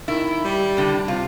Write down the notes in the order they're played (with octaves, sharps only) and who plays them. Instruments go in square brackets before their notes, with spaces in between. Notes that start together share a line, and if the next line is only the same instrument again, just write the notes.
[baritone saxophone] D#3 [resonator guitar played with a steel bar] E4
[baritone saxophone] G3
[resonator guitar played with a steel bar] A2 D3
[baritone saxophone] C3 [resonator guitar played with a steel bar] F4